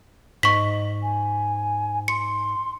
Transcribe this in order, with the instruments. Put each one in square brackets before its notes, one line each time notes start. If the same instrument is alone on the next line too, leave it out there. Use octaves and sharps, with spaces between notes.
[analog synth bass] G#2 [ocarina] D#5 [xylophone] C#6 B6
[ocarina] G#5
[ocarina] C6 [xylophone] C#7